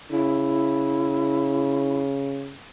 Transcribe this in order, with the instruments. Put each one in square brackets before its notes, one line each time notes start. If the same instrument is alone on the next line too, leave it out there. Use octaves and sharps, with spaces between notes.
[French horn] C#3 [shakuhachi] E4